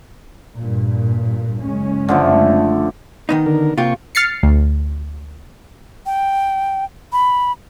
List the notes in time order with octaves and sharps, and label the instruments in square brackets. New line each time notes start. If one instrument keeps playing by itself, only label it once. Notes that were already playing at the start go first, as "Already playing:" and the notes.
[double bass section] G2 A#2
F#1 G#3 C#4
[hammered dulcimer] D3 F3 A3
[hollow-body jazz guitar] D#3 B3 D#4
[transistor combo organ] D3 A#4
[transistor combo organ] C3 A#3 C#6 [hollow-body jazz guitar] F4 G4
[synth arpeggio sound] F6 A6 C7 C#7
D2
[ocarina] G5
B5